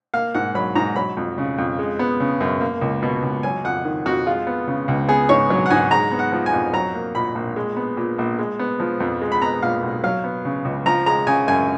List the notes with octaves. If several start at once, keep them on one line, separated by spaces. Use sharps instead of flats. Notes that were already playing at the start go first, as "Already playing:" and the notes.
A#3 F5
G#2 F#5
F#3 B5
G#2 A#5
F#3 B5
F2
C#3
F2
G#3
B3
C#3
F#2
A#3
C#2
B2
C#2
F#3 G#5
F2 F#5
D#3
F2 F#4
G#3 F4
B3
C#3
C#2
B3 G#4
G#2 C#5
F#3
F#5
G#2 G#5
G#3 A#5
B3
F#5
F3
G#5
F2
F#3 A#5
A#3
A#2 B5
A#1
G#3
B3
A#2
A#1
G#3
B3
F3
F2
G#3
B5
B3 A#5
A#2 F5
B1
F#3 F5
B3
C#3
C#2
F3 A#5
G#3 A#5
C#3 G#5
F#2 G#5